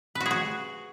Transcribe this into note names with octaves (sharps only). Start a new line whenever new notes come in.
B4
F#4
G#4
F#4